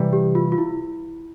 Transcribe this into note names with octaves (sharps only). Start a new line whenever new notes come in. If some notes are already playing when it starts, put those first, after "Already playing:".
Already playing: C3 E3 G3
G4
F4
F4
E4